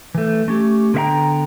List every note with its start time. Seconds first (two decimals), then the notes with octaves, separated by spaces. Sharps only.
0.15 E3 A3
0.48 A3 C#4 G4
0.94 D3 B3 A#4 E5 G5 A#5